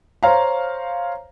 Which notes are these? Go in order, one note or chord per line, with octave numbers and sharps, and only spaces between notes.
C5 C#5 F5 A#5